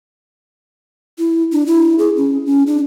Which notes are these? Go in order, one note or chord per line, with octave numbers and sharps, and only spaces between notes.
E4
D4
E4
G#4
C#4
C#4
D4